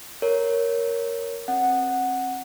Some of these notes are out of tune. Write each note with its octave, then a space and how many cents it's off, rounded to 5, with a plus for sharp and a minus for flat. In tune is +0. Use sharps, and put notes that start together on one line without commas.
A#4 +0 C#5 +0
C4 +30 F#5 +0